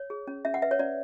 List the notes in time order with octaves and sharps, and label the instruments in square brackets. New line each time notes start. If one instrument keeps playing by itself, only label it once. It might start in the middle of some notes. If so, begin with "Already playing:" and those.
Already playing: [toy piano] C#5
G#4
C#4
C#4 E5
F#5
B4 E5
C#5
C#4 D5